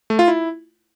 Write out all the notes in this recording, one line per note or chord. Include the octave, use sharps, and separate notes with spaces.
A3
F4
E4